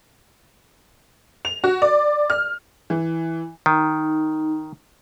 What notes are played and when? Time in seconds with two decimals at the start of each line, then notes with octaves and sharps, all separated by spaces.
1.45 F7
1.64 F#4
1.82 D5
2.30 F6
2.90 E3
3.66 D#3 D#4